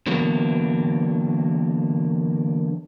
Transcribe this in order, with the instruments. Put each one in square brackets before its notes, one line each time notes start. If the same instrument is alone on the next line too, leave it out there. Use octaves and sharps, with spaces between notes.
[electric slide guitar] D3 E3 F#3 A#3 B3